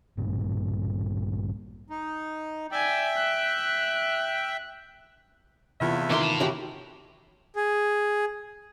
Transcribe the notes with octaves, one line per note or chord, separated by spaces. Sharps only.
A1 G2 A#2
D#4
D5 E5 G5 G#5
F#6
E2 A2 C3 E3 F4 E5
D#3 E3 A#3 E4 A#4 C6
A5 B5
E4 F#4 G4 C#5
G#4